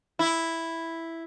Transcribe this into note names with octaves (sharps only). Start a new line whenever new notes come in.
E4